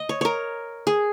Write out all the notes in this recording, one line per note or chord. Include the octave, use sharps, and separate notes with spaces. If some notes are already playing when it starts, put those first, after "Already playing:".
Already playing: D#5
C#5
A#4 C#5
G#4